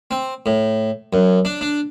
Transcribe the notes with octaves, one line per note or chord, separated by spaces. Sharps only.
C4
A2
F#2
D4
D4